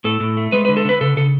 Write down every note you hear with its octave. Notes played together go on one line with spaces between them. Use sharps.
A2 A4
A2
A3
G#3 B4
D3 B4
A4
D3 B4
C#3 A4
C#3 A4